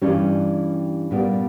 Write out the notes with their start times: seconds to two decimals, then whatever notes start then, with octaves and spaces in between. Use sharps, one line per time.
0.02 G2 E3 G3 C#4
1.11 A#2 G3 B3